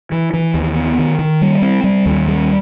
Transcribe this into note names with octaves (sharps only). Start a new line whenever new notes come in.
E3
E3
D#2
B3
D#3
D#3
G3
C4
G3
D#2
G3